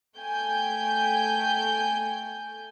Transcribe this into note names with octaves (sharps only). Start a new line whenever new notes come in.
A3 G5 G#5 G6